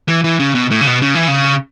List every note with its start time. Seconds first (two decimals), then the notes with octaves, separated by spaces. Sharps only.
0.08 E3
0.24 E3
0.40 C#3
0.55 B2
0.71 A2
0.81 C#3
0.87 B2
1.02 C#3
1.15 E3
1.28 C#3